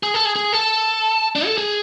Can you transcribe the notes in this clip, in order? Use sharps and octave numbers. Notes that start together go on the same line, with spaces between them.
G#4
A4
G#4
G#4
A4
D4
A4
G#4